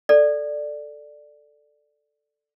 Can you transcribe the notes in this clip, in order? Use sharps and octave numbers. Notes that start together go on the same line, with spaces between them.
A4 D5